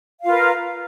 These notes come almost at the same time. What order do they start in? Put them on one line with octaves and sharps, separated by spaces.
F5 F4 B4 A#4